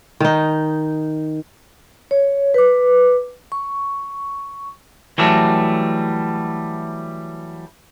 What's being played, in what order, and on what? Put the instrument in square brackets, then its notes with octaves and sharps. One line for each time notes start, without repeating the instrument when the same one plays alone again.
[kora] D#3 D#4
[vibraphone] C#5
B4 D6
C#6
[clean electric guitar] E3 F#3 G3 A3